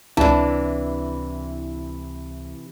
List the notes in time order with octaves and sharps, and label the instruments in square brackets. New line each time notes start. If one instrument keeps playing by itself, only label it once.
[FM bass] C#2 [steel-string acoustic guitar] C3 E3 [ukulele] D4 A5 [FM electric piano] E4